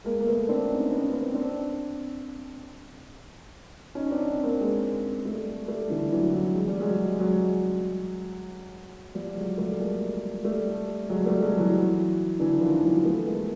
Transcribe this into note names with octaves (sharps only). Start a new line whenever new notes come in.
G#3 A#3
A#3
A3 B3
C4 D4
C#4 D#4
B3 C#4
A#3 C4
C4 D4
C#4 D#4
C4 D4
A#3 C4
G#3 A#3
G3 A3
G3 A3
D3 E3
E3 F#3
E3 F#3
G#3
G3
F#3 G#3
F#3 G#3
F3 G3
F#3 G#3
G3 A3
G#3 A#3
G3 A3
F#3 G#3
G3 A3
F#3 G#3
E3 F#3
D3 E3
D#3 F3
E3 F#3
A3 B3
G#3 A#3